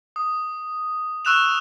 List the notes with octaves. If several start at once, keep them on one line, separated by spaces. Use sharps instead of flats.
D#6
C#6 E6 F#6 E7 F7